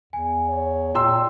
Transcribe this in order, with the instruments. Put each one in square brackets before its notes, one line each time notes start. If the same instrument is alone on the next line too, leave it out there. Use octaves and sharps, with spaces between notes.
[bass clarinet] E2 [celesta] G#5
[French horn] C#5
[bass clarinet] A#2 [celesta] G5 [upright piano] A#5 C6 E6